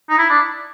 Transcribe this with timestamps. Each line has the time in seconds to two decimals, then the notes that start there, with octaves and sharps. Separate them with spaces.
0.10 D#4
0.18 E4
0.30 D4